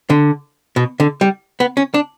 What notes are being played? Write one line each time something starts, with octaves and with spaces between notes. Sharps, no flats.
D3
B2
D3
G3
B3
C#4
D4